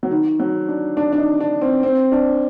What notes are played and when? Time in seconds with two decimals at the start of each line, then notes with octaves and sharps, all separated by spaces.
0.03 F#3
0.11 D#3
0.40 F#3
0.68 D4
0.97 D4
1.13 D4
1.18 D#4
1.40 D4
1.61 C4
1.83 C4
2.12 D4